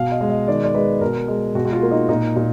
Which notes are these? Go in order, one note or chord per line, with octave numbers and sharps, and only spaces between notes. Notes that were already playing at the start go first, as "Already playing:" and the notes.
Already playing: B2 F5
D#5
G#3
D#5
D#3 D5
D5
G#3 B4
B2 A#4
G#3
B2 F#4
F#4
F4
A#3
D#4
A#2 D#4
A#2